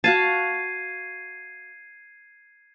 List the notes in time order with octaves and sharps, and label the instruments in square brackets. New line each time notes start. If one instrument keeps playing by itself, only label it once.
[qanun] F#4 F5 A5 [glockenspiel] G#6 C7 D#7